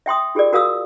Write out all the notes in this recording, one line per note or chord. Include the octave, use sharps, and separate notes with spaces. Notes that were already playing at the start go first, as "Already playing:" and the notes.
E5 G5 C6 D#6
F4 G4 G#4 A#4 D5
F#4 A#4 F5 D#6 E6